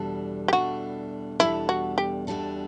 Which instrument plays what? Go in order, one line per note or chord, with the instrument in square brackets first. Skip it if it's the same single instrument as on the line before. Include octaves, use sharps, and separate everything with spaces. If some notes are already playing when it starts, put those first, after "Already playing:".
Already playing: [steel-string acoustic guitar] E2 B2 G3 D4 A4
[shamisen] G4
[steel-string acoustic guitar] E2 B2 G3 D4 A4 [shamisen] F#4
[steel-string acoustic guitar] E2 B2 G3 D4 A4 [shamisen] E4
[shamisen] F#4
G4
[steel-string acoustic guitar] E2 B2 G3 D4 A4